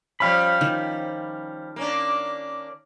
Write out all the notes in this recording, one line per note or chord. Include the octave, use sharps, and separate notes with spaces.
F3 G3 C#4 F5 B5
D#3
A#3 C#4 D4